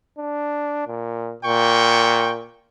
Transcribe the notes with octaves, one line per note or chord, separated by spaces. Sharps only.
D4
A#2
A#2 G5 C#6